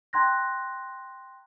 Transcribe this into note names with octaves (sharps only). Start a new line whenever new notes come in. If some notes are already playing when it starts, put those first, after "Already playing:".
G5 A#5 C6 F#6 G#6 A#6